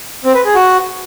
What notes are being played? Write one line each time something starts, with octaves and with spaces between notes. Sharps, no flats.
C4
B4
G#4
F#4